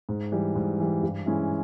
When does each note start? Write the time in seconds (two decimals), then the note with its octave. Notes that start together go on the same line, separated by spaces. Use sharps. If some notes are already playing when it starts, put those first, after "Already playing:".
0.09 G#2
0.32 E3 G3
0.55 G#2
0.80 E3 G3
1.03 G2
1.26 E3 G#3 C#4 E4